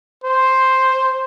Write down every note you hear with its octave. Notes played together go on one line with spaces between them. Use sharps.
C5